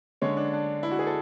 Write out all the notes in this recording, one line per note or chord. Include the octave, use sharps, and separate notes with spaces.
D3 G#3 C#4 C#5
D4
D4
E4
F#4
G#4
A4